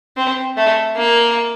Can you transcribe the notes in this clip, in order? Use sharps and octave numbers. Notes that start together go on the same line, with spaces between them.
C4
A3
A#3